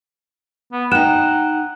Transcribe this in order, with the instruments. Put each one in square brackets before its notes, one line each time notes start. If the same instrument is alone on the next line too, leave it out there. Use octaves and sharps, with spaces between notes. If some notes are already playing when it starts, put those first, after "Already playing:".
[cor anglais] B3
[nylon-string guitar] D#4 G5 [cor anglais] F#5 [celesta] F#6 E7